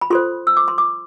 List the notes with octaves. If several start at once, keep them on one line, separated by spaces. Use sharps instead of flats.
B5
F4 A4 C5 C6
E6
D6
C6
D6